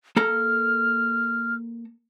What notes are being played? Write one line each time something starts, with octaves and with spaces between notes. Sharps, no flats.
A#3 A4 A#5 F6